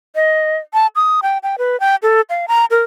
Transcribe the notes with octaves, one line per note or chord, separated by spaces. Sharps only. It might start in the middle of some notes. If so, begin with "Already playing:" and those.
D#5
A5
D#6
G5
G5
B4
G5
A4
F5
A#5
A#4